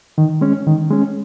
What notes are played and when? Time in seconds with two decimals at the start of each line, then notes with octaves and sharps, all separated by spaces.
0.18 D#3
0.41 G#3 C#4
0.66 D#3
0.90 G#3 C#4